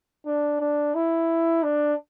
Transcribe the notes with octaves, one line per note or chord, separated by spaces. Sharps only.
D4
D4
E4
D4